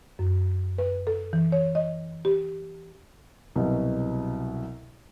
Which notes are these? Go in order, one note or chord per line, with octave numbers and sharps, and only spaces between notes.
F#2
B4
A4
E3
C#5
D#5
G4
C2 B2 F#3